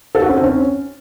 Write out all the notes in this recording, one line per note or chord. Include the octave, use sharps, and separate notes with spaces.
A4
F#4
C#4
C4
C#4